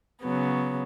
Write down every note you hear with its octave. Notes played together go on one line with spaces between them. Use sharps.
C#3 F#3 B3